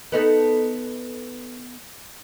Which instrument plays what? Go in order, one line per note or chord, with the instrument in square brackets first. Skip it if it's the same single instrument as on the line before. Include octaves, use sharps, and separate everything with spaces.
[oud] B3 D#4 A4